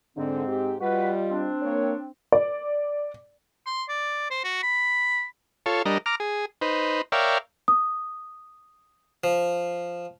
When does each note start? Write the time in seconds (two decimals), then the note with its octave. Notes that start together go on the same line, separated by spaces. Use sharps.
0.17 G#2 D3 C4
0.47 G4
0.81 G3 F4 F#4 B4 D#5
1.31 C4 D4
1.62 A#3 C#5
2.32 D5
3.66 C6
3.89 D5
4.30 C5
4.44 F#4
4.63 B5
5.66 F4 A4 C#5
5.86 G3 D4 A#4 D#5
6.06 A#5 D6 F6
6.20 G#4
6.61 D#4 B4 C5
7.12 A#4 C#5 D5 E5 F5 G5
7.68 D#6
9.24 F3